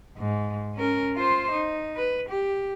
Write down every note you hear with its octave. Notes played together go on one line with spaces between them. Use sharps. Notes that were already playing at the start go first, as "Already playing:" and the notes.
G#2
C#4 A#4
F4 C5
D#4
B4
G4